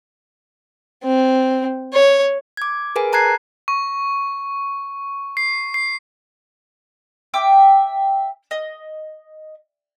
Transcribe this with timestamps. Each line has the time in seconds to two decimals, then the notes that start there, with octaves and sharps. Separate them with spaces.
1.03 C4
1.93 C#5
2.57 D6 G#6
2.96 G#4 A#4 B4 G#5
3.13 A5 A#5 F#6 G#6 C7
3.68 C#6
5.37 C7
5.74 C7
7.34 E5 G5 D6
8.51 D#5